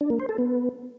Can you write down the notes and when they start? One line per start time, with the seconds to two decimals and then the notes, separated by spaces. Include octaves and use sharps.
0.01 D4
0.10 A#3
0.20 C5
0.29 A4
0.38 B3